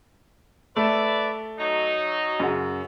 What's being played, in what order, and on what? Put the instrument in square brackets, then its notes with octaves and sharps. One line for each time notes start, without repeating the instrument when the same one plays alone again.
[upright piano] A3 [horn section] B4 D5 E5
[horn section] F#3 D#4
[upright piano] F#2 C#3 F#4